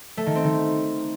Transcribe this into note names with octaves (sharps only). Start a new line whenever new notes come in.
A3
D#3
C4
D#3